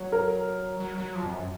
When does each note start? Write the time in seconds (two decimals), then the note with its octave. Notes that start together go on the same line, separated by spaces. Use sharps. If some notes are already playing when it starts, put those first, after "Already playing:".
Already playing: F#3
0.12 A#4
0.80 F#3
0.98 F#3
1.15 F3
1.23 F2
1.31 F#2